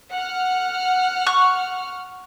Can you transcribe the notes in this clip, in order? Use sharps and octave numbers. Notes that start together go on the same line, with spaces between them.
F#5 F6
C#6 F#6